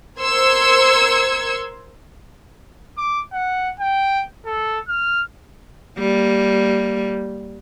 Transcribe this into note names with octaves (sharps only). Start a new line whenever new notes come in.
A#4 C5 C6 E6 G#6 C#7
D6
F#5
G5
A4
F6
G3 A#3